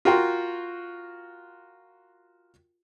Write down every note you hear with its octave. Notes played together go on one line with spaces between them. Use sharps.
F4 F#4 A#4 G5 C6